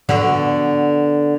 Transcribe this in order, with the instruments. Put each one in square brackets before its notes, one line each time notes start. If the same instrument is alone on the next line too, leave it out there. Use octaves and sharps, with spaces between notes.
[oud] D3 B3 F#4